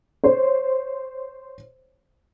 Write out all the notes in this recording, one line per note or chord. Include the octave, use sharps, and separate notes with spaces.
C5 C#5